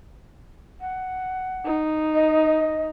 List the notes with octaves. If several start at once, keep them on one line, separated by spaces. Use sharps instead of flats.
F#5
D#4
D#5